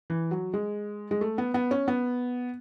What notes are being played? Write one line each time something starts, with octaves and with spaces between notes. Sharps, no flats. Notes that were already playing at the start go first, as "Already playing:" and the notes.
E3
F#3
G#3
G#3
A3
B3
B3
C#4
B3